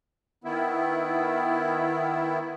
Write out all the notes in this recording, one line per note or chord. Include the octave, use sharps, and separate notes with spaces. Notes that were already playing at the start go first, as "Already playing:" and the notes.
D#3 B3 E4